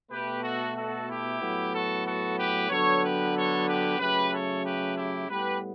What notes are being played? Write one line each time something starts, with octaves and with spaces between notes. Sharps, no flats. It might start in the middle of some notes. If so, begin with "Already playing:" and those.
B2 A3 G4 B4
F#4 A4
F#4 A4
E4 G4
A2 F#3 B3
F#4 A4
F#4 A4
G4 B4
D3 F#3 B3 A4 C#5
G4 B4
A4 C#5
G4 B4
C#3 F#3 A3 G4 B4
A4 C#5
G4 B4
E4 G4
A2 G3 B3 G4 B4